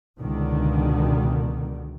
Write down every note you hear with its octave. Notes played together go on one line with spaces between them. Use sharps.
C#2 B2 D3 D#3